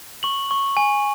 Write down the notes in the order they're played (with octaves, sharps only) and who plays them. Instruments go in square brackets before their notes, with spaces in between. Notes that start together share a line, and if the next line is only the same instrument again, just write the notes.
[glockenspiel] C#6 F#7
C#6
G#5